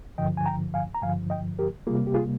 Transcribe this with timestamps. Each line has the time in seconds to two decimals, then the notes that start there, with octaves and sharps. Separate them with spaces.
0.18 G2 D3 F3 D#5 G5
0.37 G#5
0.46 G5 A#5
0.74 F5 G#5
0.95 A#5
1.02 G2 D3 F3 F5 G#5
1.30 D#5 G5
1.59 G4 A#4
1.87 C3 G3 A#3 F4 G#4
2.07 G4
2.14 F4 G#4